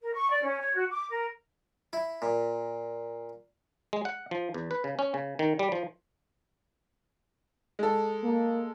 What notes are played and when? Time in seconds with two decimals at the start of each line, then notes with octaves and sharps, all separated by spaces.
0.01 A#4
0.13 C#6
0.30 D5
0.42 C#4
0.59 C#5
0.74 F#4
0.90 D6
1.10 A#4
1.93 E4
2.22 A#2
3.93 G#3
4.05 F#5
4.31 F3
4.54 E2
4.71 B4
4.84 C#3
4.99 C#4
5.14 C#3
5.39 D#3
5.59 G3
5.72 F3
7.79 G#3 A4
8.24 A#3